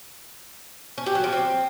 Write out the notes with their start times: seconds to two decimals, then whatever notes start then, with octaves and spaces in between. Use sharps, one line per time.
0.98 C#4
1.06 G4
1.15 F#3
1.24 F3
1.32 C4